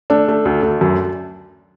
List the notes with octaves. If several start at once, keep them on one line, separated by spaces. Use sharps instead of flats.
A3 D4
A3
D2
D2
F#2